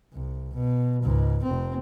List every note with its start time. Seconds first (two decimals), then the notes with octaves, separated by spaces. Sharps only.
0.13 C2
0.54 B2
1.03 C#2 G#2
1.43 F1 C4